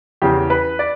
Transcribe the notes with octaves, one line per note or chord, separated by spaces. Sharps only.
E2 C#3 E3 G4
B4
D5